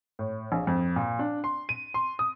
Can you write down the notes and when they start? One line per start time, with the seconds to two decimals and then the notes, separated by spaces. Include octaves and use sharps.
0.19 A2
0.52 A#1
0.67 F2
0.96 A#2
1.19 D4
1.44 C6
1.69 D#7
1.94 C6
2.19 D#6